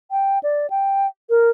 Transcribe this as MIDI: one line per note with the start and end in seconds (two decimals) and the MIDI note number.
0.11 0.39 79
0.43 0.70 74
0.70 1.07 79
1.30 1.50 70